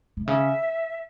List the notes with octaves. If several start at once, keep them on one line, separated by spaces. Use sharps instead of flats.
C3
C#3 E5